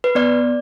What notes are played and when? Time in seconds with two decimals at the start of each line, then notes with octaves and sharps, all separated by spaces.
0.04 B4
0.15 B3 D5